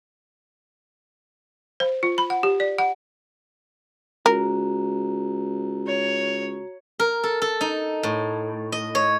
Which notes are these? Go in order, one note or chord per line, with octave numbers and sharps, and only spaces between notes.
C5
F4
B5
F#5
G4
D5
F#5
C#2 F#4 A#4 A#5
C#5
A#4
A4
A4
D#4
A2
D#5
C#5